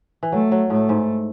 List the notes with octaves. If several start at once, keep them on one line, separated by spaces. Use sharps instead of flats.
E3
F#3 A3
F#3
A2 A3
G#2